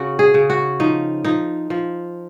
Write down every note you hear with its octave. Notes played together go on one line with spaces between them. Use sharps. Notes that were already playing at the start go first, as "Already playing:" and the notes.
Already playing: C#3 F#4
G#4
C#3
F#4
F3 D#4
F3 D#4
F3